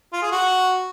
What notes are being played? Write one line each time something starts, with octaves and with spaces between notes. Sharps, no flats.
F4
G#4
F#4